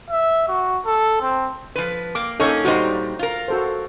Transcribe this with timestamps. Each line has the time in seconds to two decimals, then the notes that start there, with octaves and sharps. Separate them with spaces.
0.10 E5
0.48 F#4
0.86 A4
1.21 C4
1.75 F3 B4
2.15 A#3 D6
2.40 A#3 C#4 D#4 A4 C#5 C#6
2.65 A#2 G3 D#4 F#4 C5
3.19 F4 A#4
3.48 F#4 A4 C5